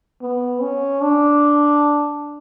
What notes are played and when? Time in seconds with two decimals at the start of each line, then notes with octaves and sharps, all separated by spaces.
0.22 B3
0.62 C#4
1.01 D4